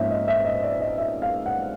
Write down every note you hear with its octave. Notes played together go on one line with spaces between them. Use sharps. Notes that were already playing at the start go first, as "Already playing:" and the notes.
Already playing: G#2 F3 A#3 C#4 E5
D#5
E5
D#5
D5
D#5
E5
F5
F#5